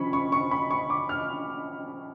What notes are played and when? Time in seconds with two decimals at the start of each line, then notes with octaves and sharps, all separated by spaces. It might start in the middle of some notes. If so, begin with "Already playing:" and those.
Already playing: F3 C#4 B5 C#6
0.13 C#6
0.32 C#6
0.51 B5
0.71 C#6
0.90 D6
1.09 F6